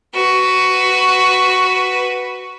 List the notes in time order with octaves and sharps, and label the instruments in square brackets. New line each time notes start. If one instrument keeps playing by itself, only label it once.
[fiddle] F#4 B4